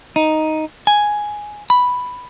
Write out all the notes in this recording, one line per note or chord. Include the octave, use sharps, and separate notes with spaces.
D#4
G#5
B5